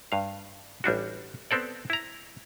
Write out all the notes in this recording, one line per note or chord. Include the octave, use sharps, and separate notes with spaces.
G2 F5
A1 G3 D4 F#4
B3 C4 A4 D5
E4 A#5